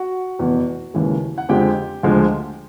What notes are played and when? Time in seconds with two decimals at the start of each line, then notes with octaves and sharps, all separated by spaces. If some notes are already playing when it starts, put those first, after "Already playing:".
Already playing: F#4 F#5
0.39 F1 E2 B2
0.94 D#2 C#3 E3 G#3
1.38 F#5
1.49 F2 D3 F3 G#3 G4 G5
2.03 D2 D3 F3 G#3